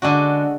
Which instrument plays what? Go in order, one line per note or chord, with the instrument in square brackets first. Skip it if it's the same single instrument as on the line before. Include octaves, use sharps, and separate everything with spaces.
[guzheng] D3 G#3 D4 F#4